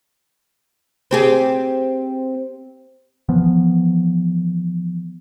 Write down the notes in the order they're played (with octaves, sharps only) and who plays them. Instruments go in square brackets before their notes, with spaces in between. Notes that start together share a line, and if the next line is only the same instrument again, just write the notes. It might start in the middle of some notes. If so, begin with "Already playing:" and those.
[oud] C4 G4 G#4
[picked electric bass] E3 F3 B3